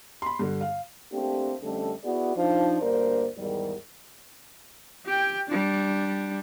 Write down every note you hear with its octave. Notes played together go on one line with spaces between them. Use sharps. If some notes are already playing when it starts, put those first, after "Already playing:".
B5 C6
G2 D3
F5
A3 A#3 C4 D4 G4
F2 D3 G3 A3 C#4 A4
B3 E4 F#4 G#4 D5
F3 D4 D#4
D2 G2 A#3 A#4 C5 D5
E2 G#2 D#3 G3 G4 A#4
G4 G5
G3 D4